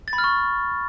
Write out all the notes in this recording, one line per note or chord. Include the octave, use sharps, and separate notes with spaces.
A6
B5
F6
C#6